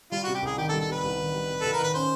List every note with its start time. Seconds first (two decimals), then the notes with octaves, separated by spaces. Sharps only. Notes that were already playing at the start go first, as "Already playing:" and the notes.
0.12 G3 F4
0.24 C3 F#4
0.35 G4
0.42 C2 G#4
0.57 D#3 G4
0.69 A4
0.73 G3
0.81 A4
0.88 C3 B4
1.03 C2
1.19 D#3
1.34 G3
1.49 C3
1.61 C2 A4
1.73 A#4
1.80 D#3 B4
1.94 C#4 C5